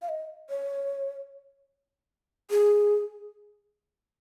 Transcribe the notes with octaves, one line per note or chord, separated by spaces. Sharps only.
F5
D#5
C#5
G#4